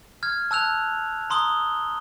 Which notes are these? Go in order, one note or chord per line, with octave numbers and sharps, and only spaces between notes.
F6 G#6
A5 E6 F#6 F7
A#5 C6 D#6 G7